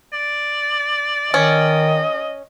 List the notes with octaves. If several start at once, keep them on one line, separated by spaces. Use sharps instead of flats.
D5
D#3 C#4 D#5